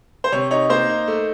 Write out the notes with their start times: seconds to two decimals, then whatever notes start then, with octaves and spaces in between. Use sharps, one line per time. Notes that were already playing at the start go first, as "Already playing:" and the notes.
0.24 C5
0.32 C3 C#5
0.51 D#4 C#5
0.70 A#3 C5
0.89 D#4
1.08 A3